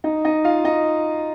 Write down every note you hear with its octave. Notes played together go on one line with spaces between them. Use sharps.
D#4 D#5
D#4 D#5
F4 F5
D#4 D#5